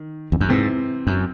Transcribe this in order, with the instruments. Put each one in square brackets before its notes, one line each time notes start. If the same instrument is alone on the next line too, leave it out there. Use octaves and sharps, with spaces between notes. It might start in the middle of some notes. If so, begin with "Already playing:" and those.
Already playing: [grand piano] D#3
[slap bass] E2
F#2
[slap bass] G#2 [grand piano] C3 E3 C4
[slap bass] F#2